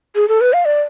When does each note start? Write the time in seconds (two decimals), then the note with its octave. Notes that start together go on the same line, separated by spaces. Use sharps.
0.16 G#4
0.28 A4
0.41 B4
0.53 F5
0.65 D5